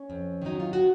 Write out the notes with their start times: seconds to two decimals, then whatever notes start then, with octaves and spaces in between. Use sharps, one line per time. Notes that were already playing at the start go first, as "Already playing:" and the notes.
Already playing: C#4
0.10 F2
0.42 D#3 F#3 D#4
0.60 F4
0.73 F#4